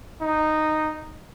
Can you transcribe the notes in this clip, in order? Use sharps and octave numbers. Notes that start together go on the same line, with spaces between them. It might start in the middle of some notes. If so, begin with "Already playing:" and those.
D#4